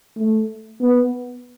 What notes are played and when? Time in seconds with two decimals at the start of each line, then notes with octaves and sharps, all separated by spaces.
0.17 A3
0.81 B3